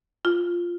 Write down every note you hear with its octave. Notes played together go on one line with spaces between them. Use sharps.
F4